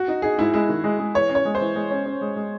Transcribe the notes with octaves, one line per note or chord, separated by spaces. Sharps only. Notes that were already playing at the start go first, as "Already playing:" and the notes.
Already playing: F#4
D#4
D#4 G#4
G#2 E4
G#3 E4
D#3
G#3
G#3
E3 C#5
C#4
C#5
G#3
C5
E3
G#3
C#4
C#4
G#3
G#3